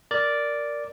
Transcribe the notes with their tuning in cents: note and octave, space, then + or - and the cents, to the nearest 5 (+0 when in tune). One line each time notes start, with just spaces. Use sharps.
A#4 +0 D5 -5